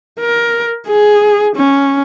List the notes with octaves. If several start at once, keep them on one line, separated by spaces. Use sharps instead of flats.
A#4
G#4
C#4